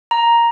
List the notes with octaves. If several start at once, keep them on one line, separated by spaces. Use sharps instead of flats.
A#5